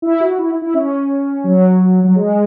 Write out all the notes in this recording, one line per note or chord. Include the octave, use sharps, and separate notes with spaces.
E4
F#4
F#4
E4
E4
C#4
F#3
F#3
G#3